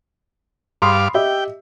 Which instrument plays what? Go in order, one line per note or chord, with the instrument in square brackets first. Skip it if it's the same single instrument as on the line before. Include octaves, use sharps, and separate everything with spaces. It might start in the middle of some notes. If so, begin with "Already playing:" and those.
[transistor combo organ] G2 F5 D6 [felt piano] B5 C6 D#6
[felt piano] G4 D#5 E5 [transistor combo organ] G5